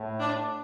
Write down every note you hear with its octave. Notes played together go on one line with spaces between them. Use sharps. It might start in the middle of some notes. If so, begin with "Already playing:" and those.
Already playing: A2
D4